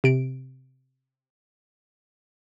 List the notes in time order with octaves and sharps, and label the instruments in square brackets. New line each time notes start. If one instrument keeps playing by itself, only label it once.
[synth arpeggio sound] C3 D7